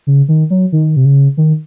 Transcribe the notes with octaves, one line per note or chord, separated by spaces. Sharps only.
C#3
D#3
F#3
D#3
C3
C#3
D#3